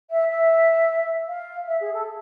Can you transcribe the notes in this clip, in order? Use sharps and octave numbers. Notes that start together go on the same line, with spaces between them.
E5
E5
F5
E5
G#4
A4